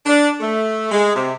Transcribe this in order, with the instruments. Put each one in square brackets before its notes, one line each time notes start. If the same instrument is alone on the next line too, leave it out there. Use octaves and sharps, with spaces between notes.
[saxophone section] D4
A3
G#3
C3